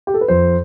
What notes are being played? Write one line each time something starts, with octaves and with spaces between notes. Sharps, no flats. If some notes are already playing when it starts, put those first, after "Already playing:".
G4
A4
B4
F2 C5